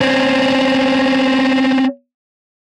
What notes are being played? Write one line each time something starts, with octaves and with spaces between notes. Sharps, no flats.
C4 C#4